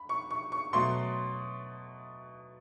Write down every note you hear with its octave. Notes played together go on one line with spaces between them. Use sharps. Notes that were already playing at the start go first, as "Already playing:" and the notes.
Already playing: B5
C#6
C#6
C#6
B2 F#3 A3 C6